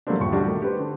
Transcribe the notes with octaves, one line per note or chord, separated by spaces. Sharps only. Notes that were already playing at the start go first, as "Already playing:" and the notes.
F#3 G3 A3 A#3 C4 D4
D#1 C#6
D3 G3 D4 F#4 G4
D#3 A3
G4 B4 C5
D3